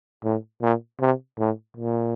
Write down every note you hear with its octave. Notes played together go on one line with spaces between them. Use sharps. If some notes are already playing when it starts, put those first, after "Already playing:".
A2
A#2
C3
A2
A#2